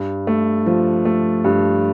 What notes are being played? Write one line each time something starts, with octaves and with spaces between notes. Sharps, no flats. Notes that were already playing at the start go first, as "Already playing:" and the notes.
Already playing: G2
A3
F3
A3
G2